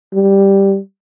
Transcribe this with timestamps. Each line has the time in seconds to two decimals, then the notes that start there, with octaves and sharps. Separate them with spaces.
0.14 G3